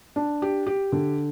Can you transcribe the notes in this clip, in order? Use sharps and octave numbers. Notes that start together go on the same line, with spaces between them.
D4
G4
G4
D3